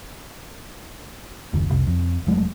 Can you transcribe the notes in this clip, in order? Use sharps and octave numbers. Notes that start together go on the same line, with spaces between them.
F#1 D#2
F1 C2
F2
F1 F#3 G#3 A3